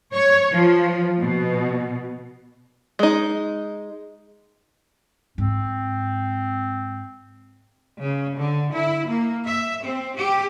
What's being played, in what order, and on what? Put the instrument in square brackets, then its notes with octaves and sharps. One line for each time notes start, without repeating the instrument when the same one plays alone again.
[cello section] C#5
F3
B2
[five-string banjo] G#3 D#4
[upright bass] G#2 [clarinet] C4
[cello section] C#3
D3
E4
A#3
E5
C4
G4